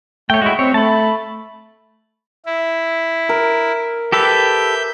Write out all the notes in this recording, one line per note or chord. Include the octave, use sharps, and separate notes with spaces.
A3 C#5 G5
G#3 E4 F#4
C4 C#5
A3 A5 B5
E4
A#4
G4 A4 B4 E5 G6